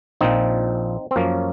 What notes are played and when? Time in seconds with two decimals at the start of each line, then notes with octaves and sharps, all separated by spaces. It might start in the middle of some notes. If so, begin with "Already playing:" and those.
0.21 A#1 A#2 F3 C4 D#4
1.11 C4
1.16 F#2 F3 A#3 C#4